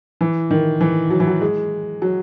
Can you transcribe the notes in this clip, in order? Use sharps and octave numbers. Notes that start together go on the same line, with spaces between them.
E3
D#3
E3
F#3
E3
F#3
G#3
F#3